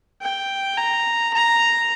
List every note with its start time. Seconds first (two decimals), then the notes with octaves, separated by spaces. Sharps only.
0.21 G5
0.77 A#5
1.34 A#5